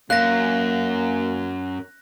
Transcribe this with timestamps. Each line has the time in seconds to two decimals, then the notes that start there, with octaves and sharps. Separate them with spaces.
0.10 F#2 A#3 F5 F#6 A#6